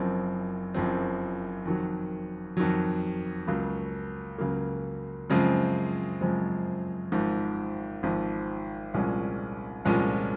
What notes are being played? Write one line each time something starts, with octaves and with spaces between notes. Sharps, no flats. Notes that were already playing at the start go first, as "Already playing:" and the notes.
Already playing: F#1 F#2 F3 C4
F#1 F#2 F3 C4
F2 D#3 F#3
F2 D#3 F#3
C#2 C#3 F#3 A#3
C#2 C#3 F#3 A#3
F#2 C#3 F3 G#3 C4
F#2 C#3 F3 G#3 C4
G#1 G#2 F3
G#1 G#2 F3
C2 A#2 F3 G#3 C#4
C2 A#2 F3 G#3 C#4